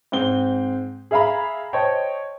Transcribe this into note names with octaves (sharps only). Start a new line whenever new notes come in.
G#2 C4 G7
G#4 E5 F5 A#5 B5
C5 C#5 D#5 G5 A5